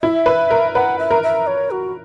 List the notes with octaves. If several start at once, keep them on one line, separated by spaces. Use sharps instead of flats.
E4 E5
B4
A#4
B4 F#5
E5
A#4
E5
C#5
F#4